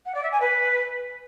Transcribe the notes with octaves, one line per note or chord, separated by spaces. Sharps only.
F#5
D5
E5
G#5
B4